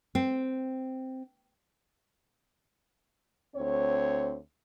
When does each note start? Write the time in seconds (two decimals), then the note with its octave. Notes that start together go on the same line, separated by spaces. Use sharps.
0.15 C4
3.55 D2 C4 C#5